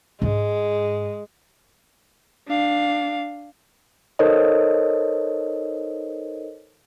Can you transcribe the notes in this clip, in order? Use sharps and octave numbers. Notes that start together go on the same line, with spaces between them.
G#2 G#3 D4
D4 F5
D#4 A4 A#4 C5 C#5 D#5